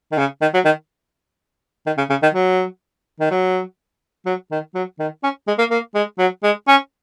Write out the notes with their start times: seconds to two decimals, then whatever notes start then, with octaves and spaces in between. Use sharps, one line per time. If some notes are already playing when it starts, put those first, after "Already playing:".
0.12 D#3
0.18 C#3
0.42 D#3
0.54 F#3
0.65 D#3
1.86 D#3
1.98 C#3
2.10 C#3
2.23 D#3
2.34 F#3
3.20 D#3
3.31 F#3
4.26 F#3
4.51 D#3
4.75 F#3
4.99 D#3
5.23 C#4
5.48 G#3
5.58 A#3
5.71 A#3
5.95 G#3
6.19 F#3
6.43 G#3
6.68 C#4